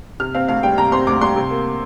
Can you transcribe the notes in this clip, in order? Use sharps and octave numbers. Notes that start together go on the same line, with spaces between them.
C3 F6
C4 F5
D2 F5
G3 G5
C3 A#5
C4 C6
D2 D6
G3 C6
C3
A#3